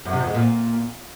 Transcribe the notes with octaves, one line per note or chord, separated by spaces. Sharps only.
F#2
C3
F2
G#3
A#2